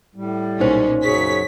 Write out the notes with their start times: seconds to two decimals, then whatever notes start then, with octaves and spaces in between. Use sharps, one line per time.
0.16 A2 G3
0.60 B1 A#2 C#4 D#4 C5
1.03 F#2 C#3 F#3 G#4 C#5 B6